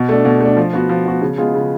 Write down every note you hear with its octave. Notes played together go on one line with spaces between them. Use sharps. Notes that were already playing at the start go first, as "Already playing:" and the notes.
Already playing: B2
A3 D4
B2
A3 D4
F3
B3 F#4
F3
B3 F#4
C#3
G#3 B3 F4 G#4
C#3